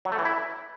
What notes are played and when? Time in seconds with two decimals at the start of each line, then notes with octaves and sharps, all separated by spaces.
0.05 F#3
0.12 A3
0.19 E3
0.25 E4